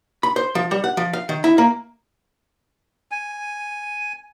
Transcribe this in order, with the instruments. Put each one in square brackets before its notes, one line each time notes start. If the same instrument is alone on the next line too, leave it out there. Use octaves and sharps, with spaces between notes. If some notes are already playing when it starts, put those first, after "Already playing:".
[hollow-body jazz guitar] B5
C5
F3
G3
F#5
F3
F5
D#3
E4
A#3
[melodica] G#5